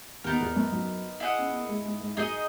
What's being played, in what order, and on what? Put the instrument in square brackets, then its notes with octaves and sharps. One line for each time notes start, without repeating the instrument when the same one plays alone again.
[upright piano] D#2 D#3 [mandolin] B3 D#4 A#4
[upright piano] E2 E3
F#2 F#3
F#2 F#3
[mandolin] E4 G#4 D#5 F#5
[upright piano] C#4
B3
A#3
G#2 G#3
G#2 G#3
G#2 G#3
[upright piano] F#2 F#3 [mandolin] D#4 G#4 D#5